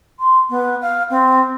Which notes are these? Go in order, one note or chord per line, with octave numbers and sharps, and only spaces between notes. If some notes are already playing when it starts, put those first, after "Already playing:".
C6
B3
F5
C4